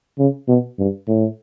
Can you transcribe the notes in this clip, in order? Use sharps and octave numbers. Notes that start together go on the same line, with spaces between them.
C#3
B2
G2
A2